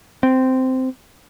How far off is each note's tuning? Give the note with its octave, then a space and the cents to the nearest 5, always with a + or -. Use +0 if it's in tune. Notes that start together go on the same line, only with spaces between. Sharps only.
C4 -10